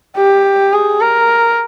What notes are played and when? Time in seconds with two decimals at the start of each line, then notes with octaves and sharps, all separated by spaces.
0.17 G4
0.73 G#4
1.01 A#4